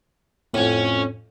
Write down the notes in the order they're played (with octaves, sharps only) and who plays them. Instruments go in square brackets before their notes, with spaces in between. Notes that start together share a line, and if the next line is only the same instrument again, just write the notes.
[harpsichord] F2 A2 [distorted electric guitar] C#4